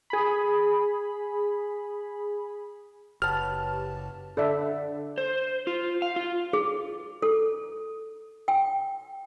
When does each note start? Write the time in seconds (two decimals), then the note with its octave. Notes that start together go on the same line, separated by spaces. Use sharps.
0.10 G#4 B5
3.22 F#1 G4 B4 C#5 F#5 A5 F6
4.37 D3 A4 D5 E5
5.18 C5
5.67 F4
6.02 F5
6.16 F4
6.53 G#4
7.22 A4
8.48 G5